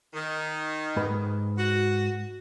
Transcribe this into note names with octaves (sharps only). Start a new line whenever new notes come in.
D#3
G#2 B4
F#4